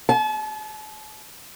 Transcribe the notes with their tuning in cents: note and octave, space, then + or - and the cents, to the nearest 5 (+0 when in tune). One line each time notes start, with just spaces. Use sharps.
A5 -40